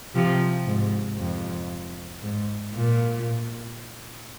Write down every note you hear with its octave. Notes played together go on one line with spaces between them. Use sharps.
C3 F3
G#2
F2
G#2
A#2